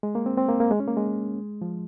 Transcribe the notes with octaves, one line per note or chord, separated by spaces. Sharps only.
G#3
A#3
C4
C4
A#3
A#3
G#3
C#4
A#3
G#3
F3